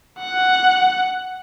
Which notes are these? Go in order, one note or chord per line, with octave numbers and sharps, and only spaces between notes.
F#5